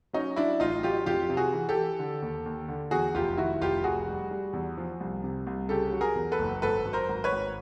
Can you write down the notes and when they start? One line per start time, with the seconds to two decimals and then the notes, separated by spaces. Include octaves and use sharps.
0.13 F#3 C#4 D#4
0.36 F#3 D4 E4
0.60 A1 D#4 F4
0.83 F#3 F4 G4
1.06 F2 F4 G4
1.29 C3
1.37 F#4 G#4
1.53 E3
1.69 G4 A4
1.76 E3
1.99 D3
2.22 D#2
2.46 D#2
2.69 D3
2.91 E2 F#4 G#4
3.15 F1 F4 G4
3.37 D#3 E4 F#4
3.61 F1 F4 G4
3.84 F1 F#4 G#4
4.08 G3
4.31 G3
4.53 E2
4.78 F3
5.00 C2
5.24 C3
5.46 C2
5.69 C#3 G4 A4
5.93 F#3
6.01 G#4 A#4
6.15 E2
6.32 A4 B4
6.39 F#1
6.62 G#1 A4 B4
6.85 F#2
6.93 A#4 C5
7.09 G#1
7.24 B4 C#5
7.32 G#1